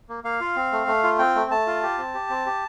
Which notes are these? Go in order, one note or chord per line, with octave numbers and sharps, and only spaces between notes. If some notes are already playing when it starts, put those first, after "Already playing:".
A#3
A#3 F5
F4
C4
A3
A3
F4
C4 G5
A3
A3 A5
F4
G4
C4
G4
C4
G4